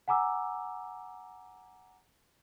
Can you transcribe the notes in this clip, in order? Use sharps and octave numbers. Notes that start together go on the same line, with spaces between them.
F#5 G#5 A#5 D6 E6